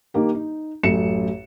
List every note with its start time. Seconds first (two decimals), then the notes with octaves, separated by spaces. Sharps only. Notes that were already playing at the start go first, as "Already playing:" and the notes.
0.14 D#3 A#3 G4
0.35 D#4
0.83 A1 F#2 A4 C#7 E7